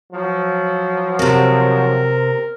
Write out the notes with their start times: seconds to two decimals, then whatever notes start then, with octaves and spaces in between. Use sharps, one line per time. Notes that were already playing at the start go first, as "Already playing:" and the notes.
0.12 F3 F#3
1.19 C3 C4 A#4